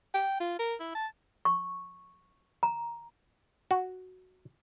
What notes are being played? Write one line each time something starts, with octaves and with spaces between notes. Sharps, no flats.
G5
F4
A#4
E4
A5
C#6
A#5
F#4